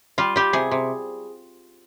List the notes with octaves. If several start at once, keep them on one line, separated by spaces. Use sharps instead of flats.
G3 F4
G3 G4
C3 G#4
C3